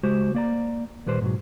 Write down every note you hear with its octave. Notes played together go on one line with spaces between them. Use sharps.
C#2 G#3 F#4 G4 C5
A#3 D5 A#5
D#2 A#2 G3 B4 C5
G#2 B2 F#3